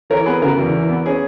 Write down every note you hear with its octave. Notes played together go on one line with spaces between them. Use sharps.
E3 A#4 C#5
B3 G#4 B4
C#3 F#4 A#4
E2
E3
B3
C#4 G#4